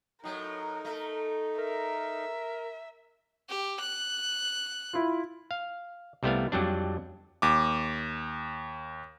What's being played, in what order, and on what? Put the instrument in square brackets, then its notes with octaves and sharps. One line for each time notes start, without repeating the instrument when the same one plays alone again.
[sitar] A2 F#3 [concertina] D#4 [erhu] A#4
[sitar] A3 A4
[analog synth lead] A#4 [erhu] E5
[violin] G4
F#6
[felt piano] E4 F4
[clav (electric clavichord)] F5
C2 G3 A3 B3 E4 F5
F2 F#3 G3 D4
[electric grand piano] D#2 D6